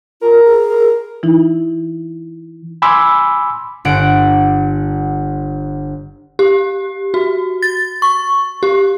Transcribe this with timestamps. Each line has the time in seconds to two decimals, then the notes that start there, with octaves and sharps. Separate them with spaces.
0.21 F4 A#4
0.46 G#4
0.70 A#4
1.23 E3 D#4 E4
2.82 G#5 B5 C6 D6 E6
3.85 G1 F#5 D7
6.39 G4
7.14 F#4
7.62 A6
8.02 C#6
8.63 G4